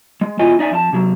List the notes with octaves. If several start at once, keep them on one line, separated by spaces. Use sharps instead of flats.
G#3
E2 B2 E3 F4 D#5 G#5
D#4 D5 E5 G#5
F2 E4 A5
C3 F#3